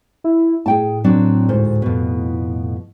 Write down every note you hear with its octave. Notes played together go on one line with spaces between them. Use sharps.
E4
A2 G#4 G5 A5
F#3 C4 D4
D2 G#2 C5
F2 B2